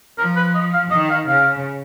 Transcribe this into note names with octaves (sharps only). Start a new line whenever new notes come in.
F3 A#4
B4
D#5
F5
D#3 D#5
F5
C#3 F5